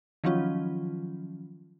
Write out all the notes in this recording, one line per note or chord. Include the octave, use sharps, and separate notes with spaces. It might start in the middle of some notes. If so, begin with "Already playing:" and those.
D#3 F3 F#3 C#4 F4